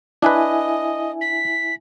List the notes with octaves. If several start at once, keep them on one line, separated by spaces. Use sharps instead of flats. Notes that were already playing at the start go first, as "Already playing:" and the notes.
D4 E4 B4 D#5 E5 G#5
B6